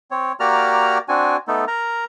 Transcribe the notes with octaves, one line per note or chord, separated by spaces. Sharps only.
C4 C#5
A#3 F#4 G4 D5 A#5 F6
C4 D4 F#4 G#5
A3 B3 D#4 A4
A#4 A#5